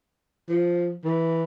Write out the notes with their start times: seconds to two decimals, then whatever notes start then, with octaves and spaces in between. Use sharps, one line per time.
0.49 F3
1.04 E3